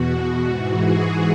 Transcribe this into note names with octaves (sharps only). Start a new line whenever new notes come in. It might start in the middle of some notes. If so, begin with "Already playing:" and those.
Already playing: E2 B2 F#4
G#2 E3 F#4
G#4